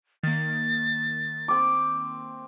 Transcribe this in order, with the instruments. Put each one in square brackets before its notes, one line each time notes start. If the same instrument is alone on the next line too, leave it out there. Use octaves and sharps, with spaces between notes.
[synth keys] D#3 A#3 [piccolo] A6
[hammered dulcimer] C4 D6